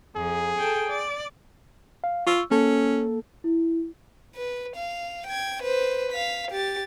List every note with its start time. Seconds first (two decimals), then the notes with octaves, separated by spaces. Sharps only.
0.16 F2 G#4
0.59 A4 G5
0.89 D5
2.04 F5
2.27 F4 C#6 E6
2.51 A#3 C#4 A4
3.44 E4
4.36 B4
4.77 F5
5.27 G5 G#6
5.63 B4 C5
6.12 F5 B6
6.51 G4 A6